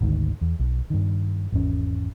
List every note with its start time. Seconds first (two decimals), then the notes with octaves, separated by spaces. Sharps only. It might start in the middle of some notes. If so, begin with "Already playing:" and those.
0.01 G#1 D2 G#2 D#3
0.41 E2
0.59 B1
0.90 G2 D#3
1.52 G#1 E2 C#4